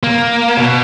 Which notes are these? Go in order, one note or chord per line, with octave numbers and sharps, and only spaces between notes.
A#3
B2